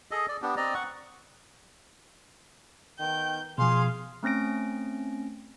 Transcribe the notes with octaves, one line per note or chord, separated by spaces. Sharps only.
G#4 A4 D#5
D5
B3 D4 G4
C4 D5 D#5 A#5
F#5 C#6
D#3 B3 G5 G6
B2 F3 G#4 F5 C6
A3 C4 C#4 A#6 D7